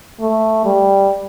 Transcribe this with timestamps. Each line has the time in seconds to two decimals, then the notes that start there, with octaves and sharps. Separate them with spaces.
0.21 A3
0.65 G3